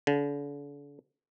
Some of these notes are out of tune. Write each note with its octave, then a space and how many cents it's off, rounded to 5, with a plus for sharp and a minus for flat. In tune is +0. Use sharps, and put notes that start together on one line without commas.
D3 -40